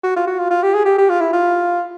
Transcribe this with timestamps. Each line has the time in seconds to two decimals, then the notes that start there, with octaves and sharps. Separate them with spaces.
0.03 F#4
0.16 F4
0.27 F#4
0.39 F4
0.50 F4
0.63 G4
0.74 G#4
0.85 G4
0.98 G4
1.10 F4
1.21 E4
1.33 F4